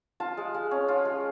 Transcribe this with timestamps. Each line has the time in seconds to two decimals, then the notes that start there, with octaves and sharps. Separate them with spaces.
0.20 F4 A5
0.37 G#3
0.54 G#3
0.71 C#4
0.88 F4
1.05 G#3